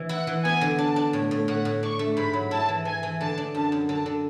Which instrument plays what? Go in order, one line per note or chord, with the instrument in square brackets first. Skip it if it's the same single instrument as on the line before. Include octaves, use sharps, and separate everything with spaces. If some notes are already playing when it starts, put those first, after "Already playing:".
Already playing: [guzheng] E3
[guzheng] E4 [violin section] F#5
[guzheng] E3
[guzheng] B3 [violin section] G#5
[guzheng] D3
[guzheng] D4 [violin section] A5
[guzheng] D4
A2
A2
[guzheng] A2 [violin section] F#5
[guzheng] A2
[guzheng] D4 [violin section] C#6
[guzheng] A3
[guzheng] G#2 [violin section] B5
[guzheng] F#3
[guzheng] E4 [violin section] A5
[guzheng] E3
[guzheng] E3 [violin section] G#5
[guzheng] E3
[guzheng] D3 [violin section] A5
[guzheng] D4
[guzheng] F#2 [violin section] A5
[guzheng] F#2
[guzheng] D3 [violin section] A5
[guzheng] D3